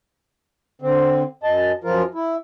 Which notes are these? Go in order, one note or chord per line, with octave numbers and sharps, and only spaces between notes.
D3 C4
F#2 D#5 A5
F#2 F3 F4 A#4
E4